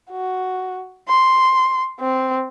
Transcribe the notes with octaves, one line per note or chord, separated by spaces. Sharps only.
F#4
C6
C4